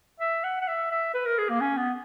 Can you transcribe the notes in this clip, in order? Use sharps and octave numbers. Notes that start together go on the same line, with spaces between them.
E5
F#5
F#5
E5
E5
B4
A#4
G#4
A#3
C#4
B3